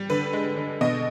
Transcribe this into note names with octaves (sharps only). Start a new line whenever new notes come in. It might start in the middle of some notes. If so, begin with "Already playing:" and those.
Already playing: G3
D3 B4
G#3
D3
B2 D#5